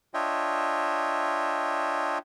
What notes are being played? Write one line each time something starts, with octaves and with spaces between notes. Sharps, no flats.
D4 F4 C#5 D#5 E5 G5